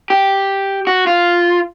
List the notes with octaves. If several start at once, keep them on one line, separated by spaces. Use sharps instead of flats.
G4
F#4
F4